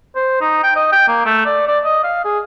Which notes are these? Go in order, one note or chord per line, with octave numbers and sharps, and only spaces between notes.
C5
D#4
G5
D#5
G5
A#3
A3
D5
D5
D#5
F5
G#4